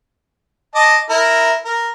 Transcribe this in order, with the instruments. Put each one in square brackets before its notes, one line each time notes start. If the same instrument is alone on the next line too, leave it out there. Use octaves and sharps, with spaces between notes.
[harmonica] D#5 A5 D6
E4 A#4
A#4